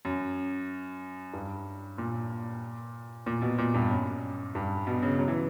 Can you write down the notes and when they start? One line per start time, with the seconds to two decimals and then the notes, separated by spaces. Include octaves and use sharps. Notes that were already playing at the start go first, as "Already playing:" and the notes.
0.05 F#2
1.34 G2
1.98 A#2
3.26 A#2
3.42 B2
3.58 A#2
3.74 G2
3.90 F#2
4.55 G2
4.87 B2
5.02 C#3
5.19 F#3
5.28 E3